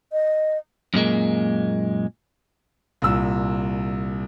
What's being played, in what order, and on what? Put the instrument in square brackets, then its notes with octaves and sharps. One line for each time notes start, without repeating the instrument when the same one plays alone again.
[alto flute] D#5
[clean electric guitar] F#2 A#2 G#3 A#3
[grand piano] C2 A#2 E6